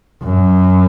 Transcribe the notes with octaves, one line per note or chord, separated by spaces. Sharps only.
F#2